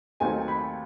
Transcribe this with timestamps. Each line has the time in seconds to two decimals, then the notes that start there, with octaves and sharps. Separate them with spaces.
0.20 D#2 D#3 F#3 A3 C4 G#5
0.48 B5